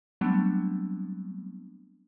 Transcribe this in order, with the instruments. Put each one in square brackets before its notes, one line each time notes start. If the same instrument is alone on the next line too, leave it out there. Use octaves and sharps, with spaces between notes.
[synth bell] F#3 G3 A3 B3 C4 D4